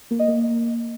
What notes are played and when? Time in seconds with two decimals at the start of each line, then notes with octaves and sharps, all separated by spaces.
0.11 A#3
0.19 D#5
0.28 A#3